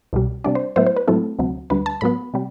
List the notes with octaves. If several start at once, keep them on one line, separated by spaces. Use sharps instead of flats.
C2 B2 G3
C3 G3 D4 D5
C5
A2 F#3 B3 E4 C5
C5
B4
A2 F#3 A3 C4 E4 A4
D2 C3 F#3
D2 D3 G3 B4
A5
A2 F#3 B3 B5
C3 G3